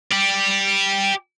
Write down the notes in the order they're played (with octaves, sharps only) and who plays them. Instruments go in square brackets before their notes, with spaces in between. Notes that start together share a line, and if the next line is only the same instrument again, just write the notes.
[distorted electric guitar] G4 D5